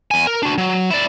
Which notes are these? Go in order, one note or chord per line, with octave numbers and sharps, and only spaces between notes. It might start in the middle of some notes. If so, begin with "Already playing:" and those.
E2 G#5
A#4
D4 F#4
F#3
E4 D5